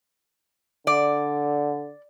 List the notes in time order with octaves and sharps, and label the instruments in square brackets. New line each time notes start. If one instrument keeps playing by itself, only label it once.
[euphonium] D3 [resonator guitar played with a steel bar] D5